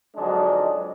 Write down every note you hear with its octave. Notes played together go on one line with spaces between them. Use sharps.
F2 D3 F#3 G#3 D4 D#4